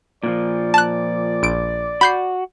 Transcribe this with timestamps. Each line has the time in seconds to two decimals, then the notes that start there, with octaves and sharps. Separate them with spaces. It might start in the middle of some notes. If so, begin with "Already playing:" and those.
0.23 A#2 D#3 F3 D5
0.74 A5 F#6
1.43 A#1 D7
2.01 F#4 B5 G6 C7